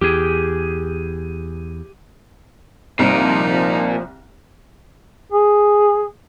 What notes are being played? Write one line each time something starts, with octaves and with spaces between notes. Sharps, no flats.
E2 G4 G#4
C2 A#2 F3 D#4
G#4